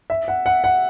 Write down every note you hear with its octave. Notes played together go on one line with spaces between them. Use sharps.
E5
F#5
F#5
F#5